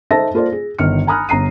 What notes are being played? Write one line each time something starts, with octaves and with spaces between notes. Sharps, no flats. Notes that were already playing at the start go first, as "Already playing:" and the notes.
D#4 A4 C5 E5 A5 A#6
A#3 F4 A4 C5 D5
G#4
G1 D#3 F6 C#7
G#5 A#5 B5 D#6 F6 F#6
G1 A#5 C7 D#7